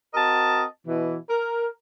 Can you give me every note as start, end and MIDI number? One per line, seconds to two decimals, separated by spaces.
0.14 0.64 60
0.14 0.64 66
0.14 0.64 70
0.14 0.64 75
0.14 0.64 81
0.87 1.16 47
0.87 1.16 52
1.30 1.66 70